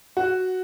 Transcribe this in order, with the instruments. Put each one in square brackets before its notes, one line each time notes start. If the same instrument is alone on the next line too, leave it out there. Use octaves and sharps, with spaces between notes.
[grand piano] F#4